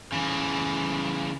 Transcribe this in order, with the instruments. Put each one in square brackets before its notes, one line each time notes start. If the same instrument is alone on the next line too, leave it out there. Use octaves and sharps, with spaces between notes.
[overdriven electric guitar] C#3 E3